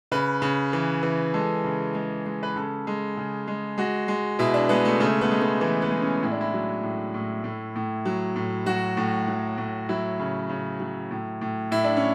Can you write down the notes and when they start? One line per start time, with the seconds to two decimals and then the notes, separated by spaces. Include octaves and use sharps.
0.12 C#3 B4
0.42 C#3
0.73 E3
1.03 E3
1.34 G#3 A4
1.64 C#3
1.95 G#3
2.26 G#3
2.43 B4
2.55 C#3 A4
2.87 G#3
3.17 C#3
3.48 G#3
3.78 G#3 F#4
4.08 G#3
4.39 B2 E4
4.54 D4
4.69 G#3 B3
4.85 A3
5.00 C#3 A3
5.21 B3
5.31 G#3
5.42 B3
5.61 E3 A3
5.82 B3
5.92 G#3
6.02 C#4
6.22 A2 E4
6.31 D4
6.41 E4
6.54 F#3
6.83 A2
7.14 A2
7.44 A2
7.76 A2
8.05 F#3
8.36 A2
8.66 F#3 F#4
8.97 A2
9.28 F#3
9.58 A2
9.89 F#3 E4
10.19 C#3
10.49 C#3
10.80 F#3
11.11 A2
11.41 A2
11.71 A2 E4
11.84 D4
11.97 C#4